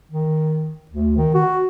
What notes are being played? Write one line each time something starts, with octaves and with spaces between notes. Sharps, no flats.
D#3
D2
D#3
F#4